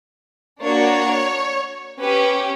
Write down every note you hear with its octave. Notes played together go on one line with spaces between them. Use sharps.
A#3 D4 F#4 C#5
C#4 G4 B4